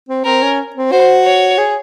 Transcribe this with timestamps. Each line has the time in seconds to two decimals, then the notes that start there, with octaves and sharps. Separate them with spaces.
0.09 C4
0.25 C4 A#4
0.43 C#4
0.76 C4
0.92 F#4 C5
1.25 C#5
1.58 G#4